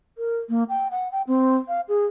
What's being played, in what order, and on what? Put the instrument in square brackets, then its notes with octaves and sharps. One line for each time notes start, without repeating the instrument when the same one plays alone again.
[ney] A#4
A#3
G5
F#5
G5
C4
F5
G#4